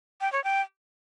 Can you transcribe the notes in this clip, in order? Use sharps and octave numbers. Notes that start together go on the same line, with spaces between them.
G5
C#5
G5